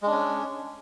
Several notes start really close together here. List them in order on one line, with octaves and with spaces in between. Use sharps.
G#3 D4 C#4